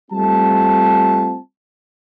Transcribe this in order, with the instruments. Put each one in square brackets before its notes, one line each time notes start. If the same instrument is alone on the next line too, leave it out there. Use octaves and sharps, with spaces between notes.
[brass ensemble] G3 A3 C4 F4 A5